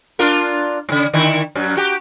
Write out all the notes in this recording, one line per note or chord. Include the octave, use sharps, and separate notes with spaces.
D4 F4 A#4
G#2 C#3
D3 D#3 E4
F#2 F#3
F#4 G4